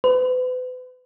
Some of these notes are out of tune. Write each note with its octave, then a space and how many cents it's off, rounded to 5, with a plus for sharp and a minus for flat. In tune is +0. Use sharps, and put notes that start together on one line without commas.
B4 +40